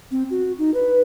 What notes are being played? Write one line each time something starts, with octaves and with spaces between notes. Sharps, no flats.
C4
F#4
D#4
B4